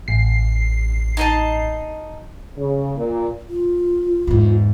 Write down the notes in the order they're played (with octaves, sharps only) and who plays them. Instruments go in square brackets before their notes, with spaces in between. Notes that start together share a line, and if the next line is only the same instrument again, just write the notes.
[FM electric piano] A1 C7
[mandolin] D#4 D#5 A5
[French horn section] C#3
A#2
[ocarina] F4
[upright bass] E2 G#2